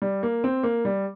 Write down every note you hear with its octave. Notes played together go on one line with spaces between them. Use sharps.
G3
A#3
C4
A#3
G3